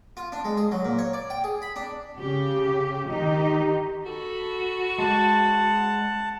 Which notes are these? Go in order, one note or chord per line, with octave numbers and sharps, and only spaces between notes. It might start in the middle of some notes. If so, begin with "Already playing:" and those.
F4
D4
G#3
G#4
F#3
A#2
C#5
D5
G5
G#4
B5
D4
C#3 G4
D#3 D#4 G4
F#4 A4 B5
G#3 D5 F#5 A5